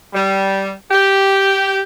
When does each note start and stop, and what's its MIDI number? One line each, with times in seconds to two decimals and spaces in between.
0.14 0.71 55
0.91 1.81 67